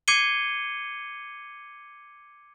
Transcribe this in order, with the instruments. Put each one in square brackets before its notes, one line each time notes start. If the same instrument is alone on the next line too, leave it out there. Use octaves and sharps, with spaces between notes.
[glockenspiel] D6 G#6 C7 C#7 D#7 G7